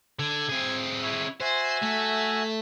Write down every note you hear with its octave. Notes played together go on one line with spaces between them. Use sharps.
D3 G#6
C4 G#4
E4 C#5
F#4 C5 E5 G#5
A3